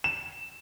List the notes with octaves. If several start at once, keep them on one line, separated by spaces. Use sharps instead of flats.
E7